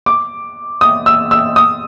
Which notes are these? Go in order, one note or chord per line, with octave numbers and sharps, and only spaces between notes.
D6
D#6
E6
E6
D#6